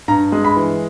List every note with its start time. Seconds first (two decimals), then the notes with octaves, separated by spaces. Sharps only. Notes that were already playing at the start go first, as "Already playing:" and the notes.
0.08 G2 A#5
0.32 G#3
0.45 B5
0.56 E3